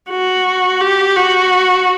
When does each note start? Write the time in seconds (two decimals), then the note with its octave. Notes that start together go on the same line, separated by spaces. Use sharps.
0.10 F#4
0.81 G4
1.16 F#4